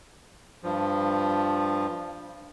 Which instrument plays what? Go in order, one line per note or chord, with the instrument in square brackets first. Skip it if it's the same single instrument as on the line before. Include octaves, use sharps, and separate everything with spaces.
[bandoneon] G2 F3